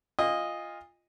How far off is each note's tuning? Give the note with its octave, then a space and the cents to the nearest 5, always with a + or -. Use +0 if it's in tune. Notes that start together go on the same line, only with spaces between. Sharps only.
F4 +0 D#5 +0 G#5 -35